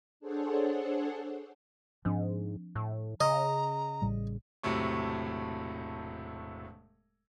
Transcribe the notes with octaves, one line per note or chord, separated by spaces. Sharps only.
D4 G#4 A4 C5 C#5 F#5
G#2 F3 C4 D4
A2
C#3 D#5 A#5
A1 A2 G3
E1 A2 C3 F#3 A3 C#6